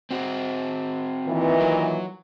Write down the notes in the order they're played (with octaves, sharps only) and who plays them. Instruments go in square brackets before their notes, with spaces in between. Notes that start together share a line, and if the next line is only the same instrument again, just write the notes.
[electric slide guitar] C4 F#4
[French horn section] A#2 D#3 E3
[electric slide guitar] F#3